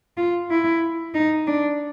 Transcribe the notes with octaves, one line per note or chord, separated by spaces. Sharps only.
F4
E4
D#4
D4